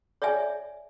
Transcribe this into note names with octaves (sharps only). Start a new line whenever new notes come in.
C#5 D5 E5 G#5